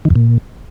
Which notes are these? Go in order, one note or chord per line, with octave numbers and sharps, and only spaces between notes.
D#3
F2
A#2